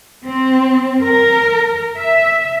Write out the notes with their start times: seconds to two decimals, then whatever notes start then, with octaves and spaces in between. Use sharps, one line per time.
0.28 C4
1.03 A#4
1.97 E5